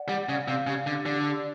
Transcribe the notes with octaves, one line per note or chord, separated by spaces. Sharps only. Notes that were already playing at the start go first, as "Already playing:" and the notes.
Already playing: D5 F#5
G3
C#3 F5
C3
C#3 G4
D3
D3 D5